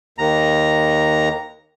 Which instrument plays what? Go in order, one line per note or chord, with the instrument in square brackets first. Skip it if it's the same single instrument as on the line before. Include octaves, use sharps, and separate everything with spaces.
[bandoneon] D#2 A#5